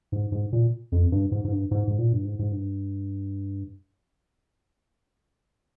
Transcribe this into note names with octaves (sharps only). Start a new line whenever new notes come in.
G#2
G#2
A#2
F2
G2
G#2
G#2
G2
G#2
G#2
A#2
G2
G#2
G#2
G2